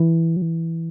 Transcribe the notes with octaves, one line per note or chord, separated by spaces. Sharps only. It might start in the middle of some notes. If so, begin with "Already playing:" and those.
Already playing: E3
F#3
E3